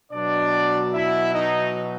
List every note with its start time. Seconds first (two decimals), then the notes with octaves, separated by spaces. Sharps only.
0.12 B2 F#3 D4 D5
0.94 E4 E5
1.34 D#4 D#5